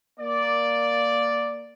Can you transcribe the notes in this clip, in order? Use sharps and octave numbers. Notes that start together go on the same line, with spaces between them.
A#3 D5